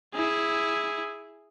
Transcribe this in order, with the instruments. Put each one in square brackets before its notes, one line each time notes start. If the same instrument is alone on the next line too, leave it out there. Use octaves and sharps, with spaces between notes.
[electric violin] E4 G#4